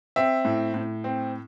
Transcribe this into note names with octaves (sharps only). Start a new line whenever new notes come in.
C4 E5
A2
A2
C4